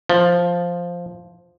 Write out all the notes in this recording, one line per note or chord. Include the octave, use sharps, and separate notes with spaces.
F3